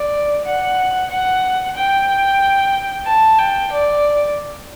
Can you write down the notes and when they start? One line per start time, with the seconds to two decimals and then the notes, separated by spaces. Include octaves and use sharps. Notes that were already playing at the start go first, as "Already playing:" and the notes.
Already playing: D5
0.46 F#5
1.11 F#5
1.76 G5
3.06 A5
3.39 G5
3.72 D5